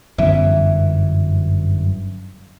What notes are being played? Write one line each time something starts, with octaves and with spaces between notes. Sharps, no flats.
G1 F#2 E3 E5